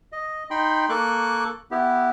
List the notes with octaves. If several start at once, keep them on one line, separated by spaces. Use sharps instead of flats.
D#5
D#4 G5 B5 C6
A#3 A4 C#6 D6 F#6
B3 E4 G4